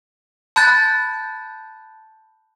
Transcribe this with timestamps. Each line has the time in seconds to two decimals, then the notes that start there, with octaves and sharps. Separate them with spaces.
0.56 A5 B5 F#6 G6 A6